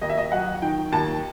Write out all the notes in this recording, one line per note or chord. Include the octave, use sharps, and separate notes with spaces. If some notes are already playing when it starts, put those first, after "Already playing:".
D#2 D#5
E5
D#5
F#3 F#5
D#3 G5
D#2 A5